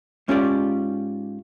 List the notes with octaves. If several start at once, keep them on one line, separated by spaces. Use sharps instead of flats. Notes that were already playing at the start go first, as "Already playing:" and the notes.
G#2 C#4 F4 G4 C5 D5